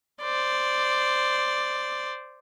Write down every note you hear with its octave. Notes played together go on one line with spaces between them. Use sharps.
C5 D5